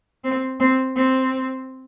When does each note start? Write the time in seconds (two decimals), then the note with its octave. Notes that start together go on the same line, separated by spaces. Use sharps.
0.24 C4
0.60 C4
0.96 C4